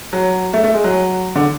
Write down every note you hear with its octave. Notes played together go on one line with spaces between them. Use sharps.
F#3
A3
A3
G#3
F#3
D3